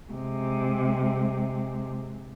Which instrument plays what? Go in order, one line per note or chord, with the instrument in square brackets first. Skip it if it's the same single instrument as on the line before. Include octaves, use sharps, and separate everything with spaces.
[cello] C3 G#3